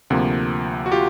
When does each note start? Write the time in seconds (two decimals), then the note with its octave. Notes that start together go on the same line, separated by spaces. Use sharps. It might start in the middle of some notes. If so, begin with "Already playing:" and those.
0.10 D2 C3 F3 A#3
0.86 F#4
0.92 F4 G4